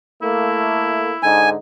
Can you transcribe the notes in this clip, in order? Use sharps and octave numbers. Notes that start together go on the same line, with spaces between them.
A3 A#3 E4
G#2 D3 D#4 G#5